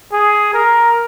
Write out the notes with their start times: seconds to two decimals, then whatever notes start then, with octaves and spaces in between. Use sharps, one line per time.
0.12 G#4
0.54 A#4